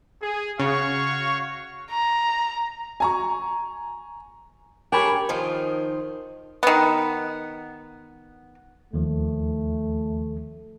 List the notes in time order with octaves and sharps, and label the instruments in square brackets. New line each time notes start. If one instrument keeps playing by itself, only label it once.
[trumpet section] G#4
[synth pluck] C#3 [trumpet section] F#4 F5 C#6 [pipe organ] C#5
[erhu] A#5
[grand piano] G#5 A#5 C#6
[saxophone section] D4 C#5 [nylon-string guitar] G4 A4 A#4 [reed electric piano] G5 G#5 B5
[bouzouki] D#3 F3 F4
[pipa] D#3 B3
[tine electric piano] D#2 D#3 F3 [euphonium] A3